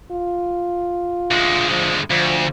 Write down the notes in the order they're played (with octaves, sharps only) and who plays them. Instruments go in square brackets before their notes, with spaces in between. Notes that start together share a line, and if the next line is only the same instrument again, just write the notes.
[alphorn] F4
[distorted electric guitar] D2 G#3
[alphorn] F3
[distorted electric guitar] D2 [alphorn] F3